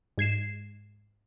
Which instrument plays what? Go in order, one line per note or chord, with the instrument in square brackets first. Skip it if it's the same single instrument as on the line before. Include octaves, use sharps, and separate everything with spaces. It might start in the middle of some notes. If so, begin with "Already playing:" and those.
[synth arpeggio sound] G#2 G#6 C7 E7